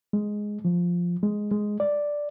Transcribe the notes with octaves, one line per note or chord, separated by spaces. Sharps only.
G#3
F3
G#3
G#3
D5